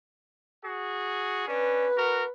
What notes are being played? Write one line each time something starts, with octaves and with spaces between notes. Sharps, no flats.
F#4 G#4
C#4 D4 B4
F#4 A#4